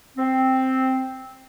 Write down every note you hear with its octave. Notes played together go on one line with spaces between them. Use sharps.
C4